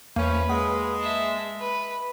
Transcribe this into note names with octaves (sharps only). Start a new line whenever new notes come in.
E2 F3 A#3 C#4 B4
G#3 F#5
E5 A5
B4